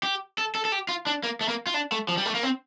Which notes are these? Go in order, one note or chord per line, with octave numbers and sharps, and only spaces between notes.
G4
A4
A4
A4
G4
F4
D4
A#3
A3
A#3
F4
D4
A3
F3
G3
A3
A#3
C4